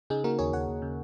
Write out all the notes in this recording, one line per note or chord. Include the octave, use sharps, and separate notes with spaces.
C#3 D#4 G#4
A#3 F#4 A#4
D#2 G#4 C#5
D#2 C#5 F#5
D#2
C#3